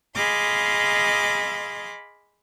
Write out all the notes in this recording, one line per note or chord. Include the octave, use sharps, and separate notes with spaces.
G#4 D#5 F5 B5 C6 D6